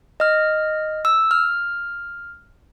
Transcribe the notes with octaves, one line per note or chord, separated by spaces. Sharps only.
D#5 F6
E6
F6